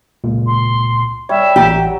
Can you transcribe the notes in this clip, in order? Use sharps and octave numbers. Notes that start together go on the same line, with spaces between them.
C#2 A#2
C6
G3 C#5 E5
A1 F#3 G4